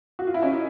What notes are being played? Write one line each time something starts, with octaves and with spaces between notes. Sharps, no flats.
F#4
F4
E4
C#4 D#4